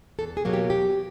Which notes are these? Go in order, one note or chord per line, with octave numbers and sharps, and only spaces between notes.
E2 A4
G#4
B2 F#3 A#3
G4
E2 G4